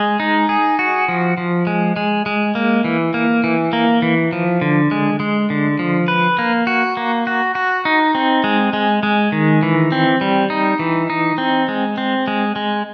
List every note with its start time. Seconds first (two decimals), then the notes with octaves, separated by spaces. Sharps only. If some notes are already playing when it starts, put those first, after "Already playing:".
Already playing: G#3 G#4
0.20 D#4
0.49 G#4
0.79 F#4
1.08 F3
1.37 F3
1.67 G#3
1.96 G#3
2.26 G#3
2.55 A#3
2.84 E3
3.14 A#3
3.44 E3
3.73 A#3
4.02 E3
4.33 F3
4.62 D3
4.91 G#3
5.20 G#3
5.50 D3
5.79 F3
6.08 B4
6.39 A#3
6.67 F#4
6.97 A#3
7.27 F#4
7.55 F#4
7.85 D#4
8.15 C4
8.44 G#3
8.73 G#3
9.03 G#3
9.32 D#3
9.63 E3
9.92 C4
10.21 G3
10.50 D#4
10.79 E3
11.10 D#4
11.38 C4
11.68 G#3
11.98 C4
12.28 G#3
12.56 G#3